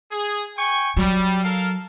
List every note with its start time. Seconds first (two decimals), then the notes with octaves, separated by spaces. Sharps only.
0.11 G#4
0.57 G5 G#5 C#6
0.96 F#3 G3
1.44 A4 A#4 F5